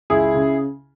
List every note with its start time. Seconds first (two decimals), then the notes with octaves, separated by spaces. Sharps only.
0.10 C#2 E4 G#4
0.34 C#3